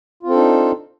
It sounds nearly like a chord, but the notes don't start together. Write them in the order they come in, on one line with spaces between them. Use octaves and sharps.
F4 C4 A4 D4 D#4